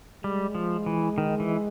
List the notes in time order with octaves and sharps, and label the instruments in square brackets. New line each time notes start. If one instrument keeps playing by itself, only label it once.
[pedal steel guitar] G3 [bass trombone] G#3
[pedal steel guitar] F3
E3
D#3
E3